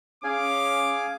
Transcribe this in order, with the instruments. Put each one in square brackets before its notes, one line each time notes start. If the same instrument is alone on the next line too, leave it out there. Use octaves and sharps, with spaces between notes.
[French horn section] C#4 [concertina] G#4 F5 G#5 [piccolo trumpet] D6